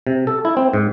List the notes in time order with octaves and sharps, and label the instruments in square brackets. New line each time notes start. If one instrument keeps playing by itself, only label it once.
[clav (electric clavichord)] C3
A4
E4
C4
G#2